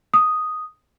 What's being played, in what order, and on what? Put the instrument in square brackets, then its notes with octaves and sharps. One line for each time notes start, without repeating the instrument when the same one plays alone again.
[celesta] D#6